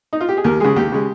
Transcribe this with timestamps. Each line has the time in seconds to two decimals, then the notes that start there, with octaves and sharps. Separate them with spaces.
0.13 D#4
0.21 F4
0.29 G4
0.37 G#4
0.44 D#2 A#4
0.60 C#3 G#3 G#4
0.76 D#2 G4
0.92 C#3 G#3